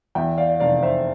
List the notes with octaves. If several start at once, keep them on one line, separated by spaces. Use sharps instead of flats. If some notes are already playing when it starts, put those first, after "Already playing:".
E2 E5 G5
D5 F5
F1 D5 F5
C5 E5